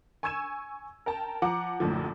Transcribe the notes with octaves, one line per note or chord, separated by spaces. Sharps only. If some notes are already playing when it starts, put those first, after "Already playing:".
G#5 C#6 E6 G#6 D#7 E7
A#4 G5 A5
F3 F#5 A#5 D6
A#1 F#2 A2 D3 F3